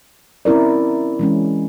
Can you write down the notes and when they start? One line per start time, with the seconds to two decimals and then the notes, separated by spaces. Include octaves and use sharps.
0.45 C4 C#4 E4 A#4 D5
1.19 E3 G#3 C#4